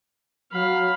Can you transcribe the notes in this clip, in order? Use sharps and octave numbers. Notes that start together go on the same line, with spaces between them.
F#3 F5 B5